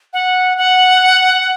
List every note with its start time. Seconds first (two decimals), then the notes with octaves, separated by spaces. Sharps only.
0.13 F#5
0.57 F#5